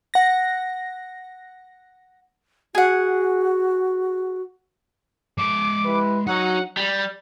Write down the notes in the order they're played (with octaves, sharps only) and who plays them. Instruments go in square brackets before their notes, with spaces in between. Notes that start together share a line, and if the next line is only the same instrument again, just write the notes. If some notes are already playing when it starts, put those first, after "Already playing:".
[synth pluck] F#5 A#6
[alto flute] F#4 [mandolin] G#4 F#5
[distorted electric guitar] G#3 E5 [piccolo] D6
[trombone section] E4 G4 B4
[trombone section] F#3 [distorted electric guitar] D#4 [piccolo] F#5
[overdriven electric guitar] G3